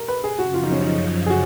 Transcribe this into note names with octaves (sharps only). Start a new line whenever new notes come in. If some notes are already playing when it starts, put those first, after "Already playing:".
Already playing: A#4
B4
G#4
F#2 C#3 F3 F#4
F4
D#4
C#4
D#4
G#4
F#4